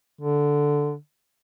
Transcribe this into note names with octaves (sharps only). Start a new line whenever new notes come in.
D3